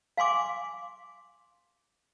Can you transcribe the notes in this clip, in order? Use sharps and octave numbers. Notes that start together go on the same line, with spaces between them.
F5 G#5 C6 D6